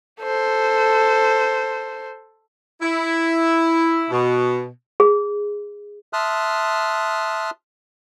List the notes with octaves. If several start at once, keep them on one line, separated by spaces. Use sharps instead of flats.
A4 C5
E4
B2
G#4
E5 A5 C6 D#6 F6 F#6